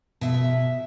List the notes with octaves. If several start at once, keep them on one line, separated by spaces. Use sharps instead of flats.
B2 E5